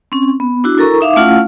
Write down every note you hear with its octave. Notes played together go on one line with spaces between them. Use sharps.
C4 C#4
B3
D4 E4 F#4
E4 A4 A#4 A#5 C#6
D#4 E5 F5 D6
A3 C#4 E4 F4 F5 F#5